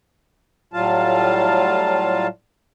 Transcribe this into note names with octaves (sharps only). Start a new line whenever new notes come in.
A2 F#3 G3 F4 F5 A5